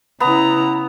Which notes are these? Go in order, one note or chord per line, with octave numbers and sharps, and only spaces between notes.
C#3 B3 E4 A#5